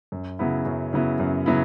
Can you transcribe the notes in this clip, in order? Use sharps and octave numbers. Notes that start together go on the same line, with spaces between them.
F#2
C#3 F#3 B3 E4
F#2
C#3 F#3 B3 E4
F#2
C#3 F#3 B3 E4